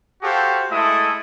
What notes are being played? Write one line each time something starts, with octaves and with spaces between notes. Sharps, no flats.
F#4 G4 A4 C5 F5
G#3 A3 E4 A4 D#6